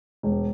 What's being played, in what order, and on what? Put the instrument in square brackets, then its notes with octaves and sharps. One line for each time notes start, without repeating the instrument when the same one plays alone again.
[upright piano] E1